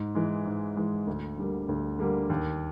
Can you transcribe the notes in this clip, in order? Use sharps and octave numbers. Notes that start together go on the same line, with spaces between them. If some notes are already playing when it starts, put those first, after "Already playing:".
Already playing: G#2
E3 G#3
G#2
E3 G#3
D2
D3 G3 A#3
D2
D3 G3 A#3
D#2